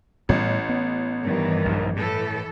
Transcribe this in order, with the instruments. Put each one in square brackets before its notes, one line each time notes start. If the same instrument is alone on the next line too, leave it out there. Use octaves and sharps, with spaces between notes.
[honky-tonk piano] A1 [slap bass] A2 G3 B3
[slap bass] B3
[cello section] G2 D#3 E3
[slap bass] A#1 G#2
[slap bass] A2 [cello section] E3 A4